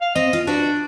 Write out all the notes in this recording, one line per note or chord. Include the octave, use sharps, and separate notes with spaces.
F5
C4 D#5
F4
D4 F#4 B4 D5